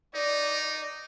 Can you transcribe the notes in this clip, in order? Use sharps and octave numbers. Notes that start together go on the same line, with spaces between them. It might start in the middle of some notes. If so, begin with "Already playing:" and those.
D#4 D5